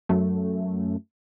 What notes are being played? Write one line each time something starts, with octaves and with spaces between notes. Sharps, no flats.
F#2 A3